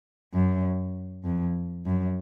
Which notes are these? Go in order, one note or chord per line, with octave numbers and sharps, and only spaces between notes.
F#2
F2
F#2